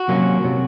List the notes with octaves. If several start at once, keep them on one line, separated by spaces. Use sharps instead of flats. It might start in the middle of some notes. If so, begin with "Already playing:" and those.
Already playing: F#4
C3 F#3 A#3 C#4
C3 F#3